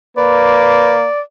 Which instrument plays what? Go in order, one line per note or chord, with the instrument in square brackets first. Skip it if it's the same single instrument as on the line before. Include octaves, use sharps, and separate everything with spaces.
[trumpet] A#3 [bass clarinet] B4 [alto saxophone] D5